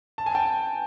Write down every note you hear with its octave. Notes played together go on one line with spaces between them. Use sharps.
A5
G#5
G5 A5